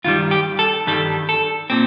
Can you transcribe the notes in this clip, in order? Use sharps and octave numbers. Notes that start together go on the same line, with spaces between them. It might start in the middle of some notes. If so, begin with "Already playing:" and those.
G2 D#3 G3 F4
G4
A4
G2 D#3 G3 A4
A4
A#2 C4